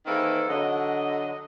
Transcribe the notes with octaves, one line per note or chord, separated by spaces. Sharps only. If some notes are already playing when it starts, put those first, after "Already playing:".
D#3 E3 A#3 C4 G#4 A4
D3 F#3 D#5